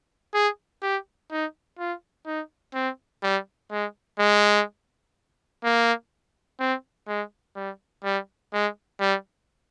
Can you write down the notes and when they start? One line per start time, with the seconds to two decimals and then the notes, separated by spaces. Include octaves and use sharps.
0.34 G#4
0.82 G4
1.31 D#4
1.79 F4
2.26 D#4
2.74 C4
3.23 G3
3.71 G#3
4.19 G#3
5.64 A#3
6.60 C4
7.07 G#3
7.56 G3
8.04 G3
8.53 G#3
9.00 G3